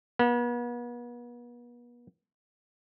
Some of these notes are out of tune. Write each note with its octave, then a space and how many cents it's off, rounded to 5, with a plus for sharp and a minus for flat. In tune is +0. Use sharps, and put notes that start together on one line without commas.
B3 -40